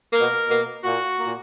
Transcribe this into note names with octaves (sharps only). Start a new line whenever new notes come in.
B2 A#3 A#4
B2 A#3
A#2 A#3 F#4
A#2 A#3